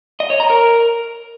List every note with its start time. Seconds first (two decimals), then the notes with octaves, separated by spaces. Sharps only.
0.20 D#5
0.30 C#5
0.40 A#5
0.50 A#4